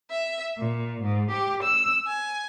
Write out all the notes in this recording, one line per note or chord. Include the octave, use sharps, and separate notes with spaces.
E5
A#2
G#2
G4
E6
G#5